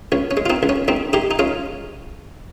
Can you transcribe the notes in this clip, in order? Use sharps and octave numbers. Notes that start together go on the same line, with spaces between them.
C#2 C#4
C#4
G#3
F4
C4 D#4
C#2
C#4
C#2 C4 D#4
G#3 D#4 G4
D#4
G#3 C#4 F4